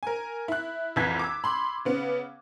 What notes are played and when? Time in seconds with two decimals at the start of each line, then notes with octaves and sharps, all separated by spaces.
0.03 A#4 G#5
0.48 E4 F#6
0.96 C2 F2 E3 G#6 B6
1.19 D6 E6
1.44 B5 C6
1.85 C#3 B3